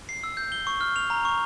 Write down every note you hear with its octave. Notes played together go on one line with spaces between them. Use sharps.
C7
E6
G6
G7
C#6
F6
F7
A#5
C#6